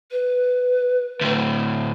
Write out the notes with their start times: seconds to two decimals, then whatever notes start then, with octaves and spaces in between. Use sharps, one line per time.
0.11 B4
1.21 D2 A2